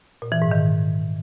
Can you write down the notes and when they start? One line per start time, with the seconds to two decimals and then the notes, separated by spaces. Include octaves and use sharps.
0.22 A#2
0.32 E3
0.42 G#2
0.51 D#3